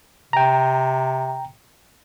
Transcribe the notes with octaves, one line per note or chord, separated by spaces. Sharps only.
C3 G5 A#5